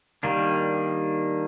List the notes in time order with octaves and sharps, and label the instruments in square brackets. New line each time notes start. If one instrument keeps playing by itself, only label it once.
[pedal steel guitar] D#3 G3 A#3 D4